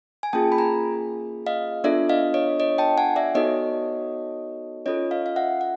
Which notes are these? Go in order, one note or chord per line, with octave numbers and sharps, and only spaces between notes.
G#5
A#3 C#4 F4 G#4 G5 A5
B5
G#5 A#5
D#5 F5
B3 D4 F4 A4 D5 E5
D#5 F5
C#5 D#5
C#5 D#5
G5 A5
F#5 G#5
D5 E5
B3 D#4 F#4 A4 C#5 D#5
C#4 F4 A4 C#5 D#5
D#5 F5
F5
E5 F#5
F#5